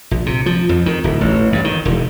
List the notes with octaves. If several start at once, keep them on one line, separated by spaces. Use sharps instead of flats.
A#1
C3
F3
F2
D#3
D1
A1
G2
D#3
E1